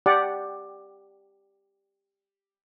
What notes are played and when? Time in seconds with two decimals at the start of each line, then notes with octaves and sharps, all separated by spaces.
0.06 G4 D5 F#5